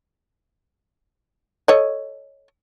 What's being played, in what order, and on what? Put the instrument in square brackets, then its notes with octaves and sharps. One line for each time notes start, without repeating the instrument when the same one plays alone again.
[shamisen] A4 C#5 D#5